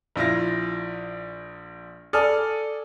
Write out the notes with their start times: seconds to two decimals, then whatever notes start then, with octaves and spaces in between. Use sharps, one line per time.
0.16 A#1 E4 F4 A#6
2.13 A4 D5 G#5 D#6 F6